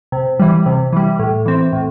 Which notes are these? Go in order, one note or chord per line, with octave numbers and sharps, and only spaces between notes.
C3
E3 G3
C3
E3 G3
A2
E3 C4
A2